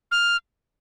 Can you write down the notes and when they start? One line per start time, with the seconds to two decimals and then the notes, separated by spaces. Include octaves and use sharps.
0.12 F6